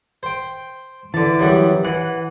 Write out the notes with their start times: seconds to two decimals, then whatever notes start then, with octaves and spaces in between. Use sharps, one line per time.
0.23 C5 G5
1.14 D3 E3 A5
1.39 F#2 G3 F#5
1.85 E3 F#5